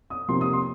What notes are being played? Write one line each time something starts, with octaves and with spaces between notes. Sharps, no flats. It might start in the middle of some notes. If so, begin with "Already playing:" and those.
D#6
C3 F3 A#3 D#4 C6
D#6
C6